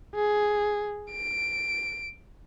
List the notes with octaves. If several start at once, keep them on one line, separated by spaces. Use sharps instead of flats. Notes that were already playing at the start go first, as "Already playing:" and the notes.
G#4
D7